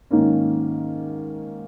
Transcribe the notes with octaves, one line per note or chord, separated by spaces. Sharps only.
G#2 D#3 A#3 C#4